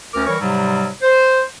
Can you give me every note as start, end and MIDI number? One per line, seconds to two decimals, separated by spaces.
0.14 0.23 38
0.14 0.23 61
0.14 0.23 70
0.14 0.23 86
0.14 0.23 89
0.27 0.35 52
0.27 0.35 55
0.27 0.35 70
0.27 0.35 73
0.27 0.35 85
0.40 0.87 44
0.40 0.87 48
0.40 0.87 54
0.40 0.87 55
1.02 1.42 72